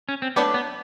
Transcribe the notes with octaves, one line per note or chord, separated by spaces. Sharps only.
C#4
C4
F#3 A3 B3 D4 G4 B4
B3